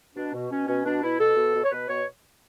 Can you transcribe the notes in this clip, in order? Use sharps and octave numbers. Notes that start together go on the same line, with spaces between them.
B2 D4
B2
B2 C#4
B2 C#4
B2 D4
B2 E4
B2 A4
B2
B2
C#5
B2 B4
B2 C#5